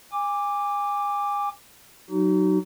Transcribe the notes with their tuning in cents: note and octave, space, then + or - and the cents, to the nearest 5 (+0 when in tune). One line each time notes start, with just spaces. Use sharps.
G#5 -30 D6 +0
F#3 +0 D#4 -10 F#4 +40